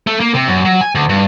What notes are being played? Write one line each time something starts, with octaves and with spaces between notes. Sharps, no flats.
A3
A#3
C3
F#2
F#3
G#5
D2
G2